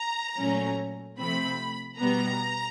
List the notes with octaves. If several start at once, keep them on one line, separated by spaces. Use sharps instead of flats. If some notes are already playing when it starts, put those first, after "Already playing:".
Already playing: A#5
A#2 F#3 A3 C#4
C3 F3 A3 C4 B5
B2 G3 B3 A#5